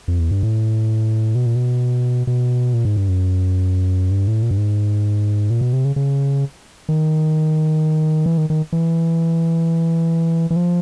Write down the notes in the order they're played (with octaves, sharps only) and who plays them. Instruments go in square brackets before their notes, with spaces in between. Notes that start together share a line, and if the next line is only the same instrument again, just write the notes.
[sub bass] F2
E2
G2
A2
B2
A#2
B2
B2
A#2
G#2
G2
F#2
G2
A2
A#2
G2
G#2
A#2
B2
C3
C#3
C#3
D#3
E3
D#3
D#3
E3
E3
F3